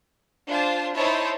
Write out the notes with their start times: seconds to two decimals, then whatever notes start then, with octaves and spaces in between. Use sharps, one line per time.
0.48 D4 F4 C5 A5
0.94 D#4 E4 C5 C#5 A5